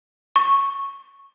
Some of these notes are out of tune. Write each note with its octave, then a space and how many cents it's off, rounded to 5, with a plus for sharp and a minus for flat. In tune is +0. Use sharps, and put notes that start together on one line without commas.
C#6 -5